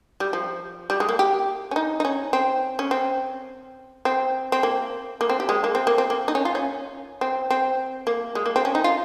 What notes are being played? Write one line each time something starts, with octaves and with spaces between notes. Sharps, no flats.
G3
F3
G3
G#3
A#3
G4
C#4
D#4
D#4
C#4
C4
C#4
C4
C4
C4
A#3
A#3
C4
G4
G#3
A#3
C4
A#3
C4
A#3
D#4
C#4
F4
C#4
C4
C4
A#3
G#3
A#3
C4
C#4
D#4
F4